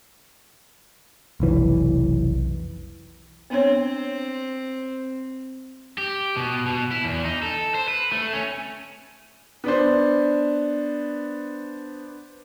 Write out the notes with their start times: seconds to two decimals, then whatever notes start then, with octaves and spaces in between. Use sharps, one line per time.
1.40 F1 B1 E3
3.50 B3 C4 D4 C#5
5.98 G4
6.37 B2
6.66 B2
6.92 E4
7.05 E2
7.25 D#4
7.43 A4
7.75 C5
7.88 B4
8.12 A3
8.33 C#4
9.64 B3 D4 C5